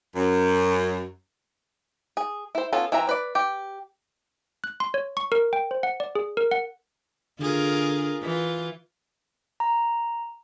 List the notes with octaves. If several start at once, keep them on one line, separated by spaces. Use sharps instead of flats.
F#2
G#4
E4 C5
B3 C#4 F4 A4
E3 C4 E5 A#5
B4 D5
G4
F#6
C6
C#5
C#6
A#4
G5
C5
F#5
D5
G#4
A#4
F#5
D3 F4 G#4 A#4
E3 F4
A#5